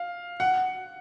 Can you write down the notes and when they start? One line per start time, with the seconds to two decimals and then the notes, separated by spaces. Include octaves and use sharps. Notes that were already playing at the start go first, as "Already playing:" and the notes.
Already playing: F5
0.40 F#5